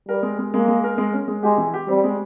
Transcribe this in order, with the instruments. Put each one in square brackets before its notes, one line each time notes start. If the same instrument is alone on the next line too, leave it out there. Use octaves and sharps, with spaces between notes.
[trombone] G3 [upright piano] A#4
[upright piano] G#3
G#3
[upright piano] G#3 [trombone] A#3
[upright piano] G#3
A#4
G#3
C#4
G#3
[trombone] G#3 [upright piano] G4
[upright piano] E3
G4
[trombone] G3 [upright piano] C4
[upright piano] G#3